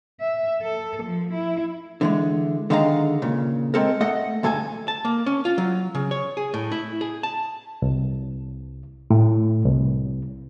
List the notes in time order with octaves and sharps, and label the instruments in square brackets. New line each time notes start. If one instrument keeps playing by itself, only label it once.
[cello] E5
A4
F3
E4
[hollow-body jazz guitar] D3 E3 G#3
D3 D#3 G#3 F5 F#5 A#5
A#2 C#3
G#3 C4 A4 A#4
A3 A4 D#5 F#5
D2 G2 A4 G#5 A5
A5
A#3
C#4
F4
F#3
C#3
C#5
G#4
A2
E4
G#4
A5
[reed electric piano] C2
A2
C2